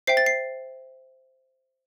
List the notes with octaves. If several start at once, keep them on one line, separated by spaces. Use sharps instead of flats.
C5 E5 G5 C7
A6
C7